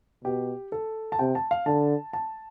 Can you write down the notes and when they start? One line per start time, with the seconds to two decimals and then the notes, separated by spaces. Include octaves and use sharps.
0.24 B2 G4
0.72 A4
1.12 A5
1.19 C3 G5
1.35 A5
1.51 F5
1.66 D3 A5
2.13 A5